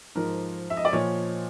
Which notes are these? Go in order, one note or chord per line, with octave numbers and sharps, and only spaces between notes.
G#2 F3 A#4
E5
D#5
D5
A#2 F3 C#5